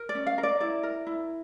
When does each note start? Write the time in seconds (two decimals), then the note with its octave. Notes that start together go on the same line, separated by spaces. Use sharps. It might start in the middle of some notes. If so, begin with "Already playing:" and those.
Already playing: A#4
0.09 D5
0.15 C#4
0.26 F5
0.38 A#4
0.43 D5
0.60 E4 D5
0.83 A#4
1.07 E4